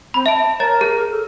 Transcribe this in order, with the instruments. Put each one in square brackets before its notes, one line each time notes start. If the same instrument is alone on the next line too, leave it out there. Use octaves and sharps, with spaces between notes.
[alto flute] C4 [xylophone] B5
[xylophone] E5 D7 [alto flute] A5
[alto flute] A#4 [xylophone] C#5 A#5 A6
[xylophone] G#4
[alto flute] A4